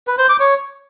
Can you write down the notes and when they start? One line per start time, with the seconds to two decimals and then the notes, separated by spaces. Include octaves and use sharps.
0.07 B4
0.18 C5
0.29 D6
0.40 C#5